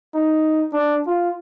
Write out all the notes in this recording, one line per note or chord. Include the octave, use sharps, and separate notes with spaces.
D#4
D4
F4